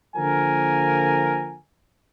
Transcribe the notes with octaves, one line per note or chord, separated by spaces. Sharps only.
D3 F3 A#3 A#4 G#5